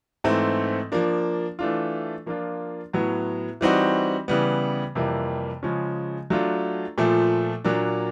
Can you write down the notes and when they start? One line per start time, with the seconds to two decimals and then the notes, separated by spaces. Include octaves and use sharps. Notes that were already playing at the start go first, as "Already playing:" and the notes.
0.24 G#2 E3 A3 C4
0.92 F3 A#3 D4
1.59 E3 A3 D4 F4
2.26 F3 A#3 D4 F4
2.93 A2 F#3 B3
3.61 E3 G3 C4 D#4 F#4
4.28 C#3 E3 G3 B3
4.95 F2 C3 E3 G3 A#3
5.63 C#3 F3 G#3 C#4
6.30 F#3 A3 D4 F4
6.98 A#2 F3 A3
7.64 A#2 F#3 A#3 D4